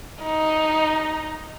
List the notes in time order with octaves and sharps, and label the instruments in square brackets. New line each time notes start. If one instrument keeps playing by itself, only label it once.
[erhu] D#4